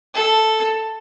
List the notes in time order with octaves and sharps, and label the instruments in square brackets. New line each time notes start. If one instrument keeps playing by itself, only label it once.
[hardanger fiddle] A4